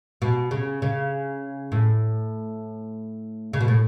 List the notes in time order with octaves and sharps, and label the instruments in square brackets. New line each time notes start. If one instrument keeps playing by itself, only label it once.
[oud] B2
C#3
C#3
A2
C#3
B2
A2